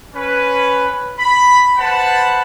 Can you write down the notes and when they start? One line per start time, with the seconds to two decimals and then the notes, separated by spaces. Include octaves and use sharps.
0.15 C#4 B4
1.18 B5
1.78 B4 C5 F#5 A5 B5